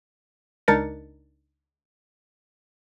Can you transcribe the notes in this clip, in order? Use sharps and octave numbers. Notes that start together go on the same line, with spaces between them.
C#2 D4 D#4 A#4 A6 C#7